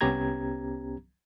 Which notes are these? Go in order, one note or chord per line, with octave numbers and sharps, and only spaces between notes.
C2 B3 C#4 G4 A#5 G#6